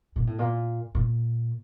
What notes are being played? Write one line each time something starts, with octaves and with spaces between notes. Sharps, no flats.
A#2
A2
A#2
A#2